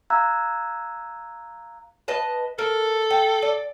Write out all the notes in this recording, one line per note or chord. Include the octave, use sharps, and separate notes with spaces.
F5 A#5 E6 F#6 G#6
B4 D#5 A5
A4 A#4
G5
D5